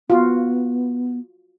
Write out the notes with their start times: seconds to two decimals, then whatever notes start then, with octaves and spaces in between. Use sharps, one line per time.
0.10 B3 F4 F#4